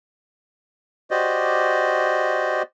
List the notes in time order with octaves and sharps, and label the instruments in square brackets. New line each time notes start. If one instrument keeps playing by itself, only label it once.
[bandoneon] F#4 G4 C5 D5 D#5